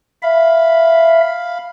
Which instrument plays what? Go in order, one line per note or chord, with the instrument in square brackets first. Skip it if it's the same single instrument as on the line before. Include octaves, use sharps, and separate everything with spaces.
[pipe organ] E5 [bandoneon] F5 B5